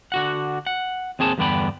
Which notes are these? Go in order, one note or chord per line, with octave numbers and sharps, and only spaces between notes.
D3 F#4 F#5
F#5
D#2 C4 G#4 A5
E2 G2 D3 B3 G5 B5